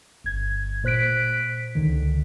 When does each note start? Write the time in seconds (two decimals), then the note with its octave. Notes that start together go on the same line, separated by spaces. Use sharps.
0.24 G1 G#6
0.84 A#2 C5 F#6 B6 D7
1.75 C#2 D3 D#3